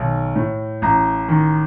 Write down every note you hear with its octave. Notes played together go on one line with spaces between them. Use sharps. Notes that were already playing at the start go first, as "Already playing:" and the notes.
Already playing: B1 D#3
A2
A1 A#5
D#3